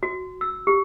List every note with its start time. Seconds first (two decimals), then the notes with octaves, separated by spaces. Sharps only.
0.03 F#4
0.41 E6
0.67 G4